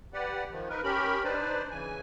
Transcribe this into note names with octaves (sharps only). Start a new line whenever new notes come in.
G4 B4 D5 F#5
D#3 F3
D#4 A#4 B4
C#4 G4 A#4 B5
D4 D#4 B4 C5 D5
C#3 E3 G#5